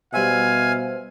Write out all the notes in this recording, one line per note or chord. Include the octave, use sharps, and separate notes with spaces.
B2 G3 C5 E5 F5 G#5